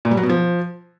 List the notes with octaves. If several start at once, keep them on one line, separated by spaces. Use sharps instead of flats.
A#2
G3
F#3
B2
F3